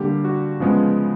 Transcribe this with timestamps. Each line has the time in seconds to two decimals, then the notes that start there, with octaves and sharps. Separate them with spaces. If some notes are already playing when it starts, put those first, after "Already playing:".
Already playing: D3 G3 A#3 G4
0.24 F#4
0.60 C#3 F3 G#3 B3